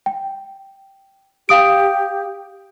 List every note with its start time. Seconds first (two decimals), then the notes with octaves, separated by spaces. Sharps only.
0.06 G5
1.49 G4 F5 D#6 D7